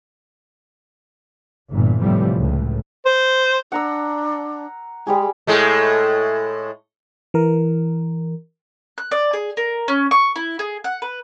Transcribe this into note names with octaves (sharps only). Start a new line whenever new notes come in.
G1 A#2 E3
F2 A2 C3 E3 F3 G3
C#2 A2
C5
D4 F#5 A#5 E6
G3 G#3 G4 G#4
A2 G#3 A3
E3 A#4
F#6
D5
G#4
A#4
C#4
C#6
E4
G#4
F#5
B4